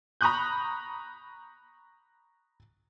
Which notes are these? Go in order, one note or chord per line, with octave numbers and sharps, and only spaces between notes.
A#5 B5 C#6 D#6 F#6 G6